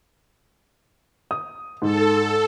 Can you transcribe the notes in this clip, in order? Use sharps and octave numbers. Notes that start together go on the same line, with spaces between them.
D#6
G#2 A4